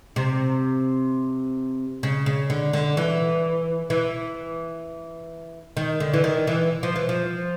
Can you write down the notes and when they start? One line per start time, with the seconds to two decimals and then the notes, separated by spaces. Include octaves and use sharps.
0.16 C3
2.03 C#3
2.26 C#3
2.50 D3
2.73 D3
2.97 E3
3.90 E3
5.77 D#3
6.00 D3
6.14 E3
6.24 D#3
6.47 E3
6.83 F3
6.96 E3
7.09 F3